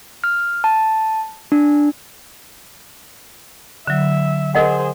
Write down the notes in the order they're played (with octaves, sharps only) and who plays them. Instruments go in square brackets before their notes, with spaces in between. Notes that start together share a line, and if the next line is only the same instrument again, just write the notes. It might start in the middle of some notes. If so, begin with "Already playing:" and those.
[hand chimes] F6
A5
D4
[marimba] D3 F#3 [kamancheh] E5
[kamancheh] G#4 C5 [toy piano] A#4 D#5 F#5